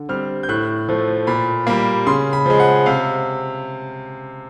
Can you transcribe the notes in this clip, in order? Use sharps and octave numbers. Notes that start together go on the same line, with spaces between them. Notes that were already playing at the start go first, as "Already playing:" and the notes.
Already playing: D3
G3 C4 F6
G6
A2 F#6
F3 A3
A#2 B5
G3 A#3 B5
C#3 C6
B5
F3 G#3
F#5
C3 F5